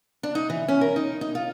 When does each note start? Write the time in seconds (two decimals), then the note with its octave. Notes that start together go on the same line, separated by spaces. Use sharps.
0.23 D4
0.35 D#4
0.50 E3
0.68 C#4
0.81 A#4
0.96 D#4
1.21 D#4
1.35 F4